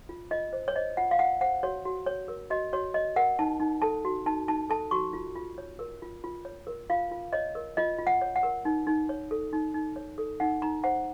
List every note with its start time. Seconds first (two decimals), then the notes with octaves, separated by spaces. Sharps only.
0.09 F4
0.31 F4 D#5
0.53 C5
0.68 C#5
0.75 C5 D#5
0.97 F4 F#5
1.11 F5
1.19 F4 F#5
1.41 C5 F#5
1.63 F#4 C#5
1.85 F#4
2.06 C#5
2.28 A#4
2.50 F#4 D#5
2.73 F#4 C#5
2.94 C#5 D#5
3.16 A#4 F#5
3.39 D#4 A5
3.60 D#4
3.82 A4 A5
4.05 F#4
4.26 D#4 A5
4.48 D#4 A5
4.70 A4 A5
4.91 F#4 C#6
5.13 F4
5.35 F4
5.58 C#5
5.79 A#4
6.02 F4
6.24 F4
6.45 C#5
6.67 A#4
6.90 F4 F5
7.11 F4
7.33 C#5 D#5
7.55 A#4
7.77 F4 D#5
7.98 F4
8.07 F#5
8.22 C#5
8.36 F#5
8.43 A#4
8.65 D#4
8.87 D#4
9.09 C#5
9.31 A4
9.53 D#4
9.74 D#4
9.96 C#5
10.18 A4
10.40 D#4 F#5
10.62 D#4 A#5
10.84 C5 F#5